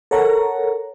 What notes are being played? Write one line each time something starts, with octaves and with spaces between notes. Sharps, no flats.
A4 A#4 C#5 F#5 A#5